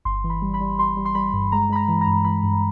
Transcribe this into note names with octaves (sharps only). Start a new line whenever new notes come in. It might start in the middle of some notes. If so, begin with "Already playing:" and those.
G1 C6
E3
B5
G3
B5
G3
G3 C6
G3
C6
G3 B5
G2
G#3 A#5
G#3 B5
A#5
E3
A#5
G2
E3 B5
G2